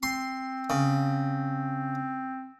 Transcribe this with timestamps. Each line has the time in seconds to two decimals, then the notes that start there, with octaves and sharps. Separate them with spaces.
0.03 C4 C6
0.70 C#3